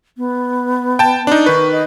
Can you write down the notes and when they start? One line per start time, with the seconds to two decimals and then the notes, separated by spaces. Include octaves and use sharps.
0.18 B3
0.99 G5 A5
1.27 D4 D#4
1.46 D#3 B4 C#6
1.72 D#5